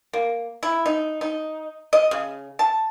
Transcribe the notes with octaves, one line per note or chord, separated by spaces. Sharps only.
A#3
E4
D#4
D#4
D#5
C#3
A5